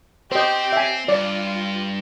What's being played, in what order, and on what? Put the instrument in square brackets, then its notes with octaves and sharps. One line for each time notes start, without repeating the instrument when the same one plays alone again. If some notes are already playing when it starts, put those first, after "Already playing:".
[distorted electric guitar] C4 [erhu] G4 [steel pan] C5 D#5
[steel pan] E5 G#5
[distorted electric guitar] G2 [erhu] F4 [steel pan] D5